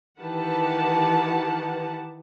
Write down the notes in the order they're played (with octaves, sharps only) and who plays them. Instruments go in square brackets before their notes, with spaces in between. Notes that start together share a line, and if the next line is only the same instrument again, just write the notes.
[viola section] D#3 E3 G4 B4 F#5 A5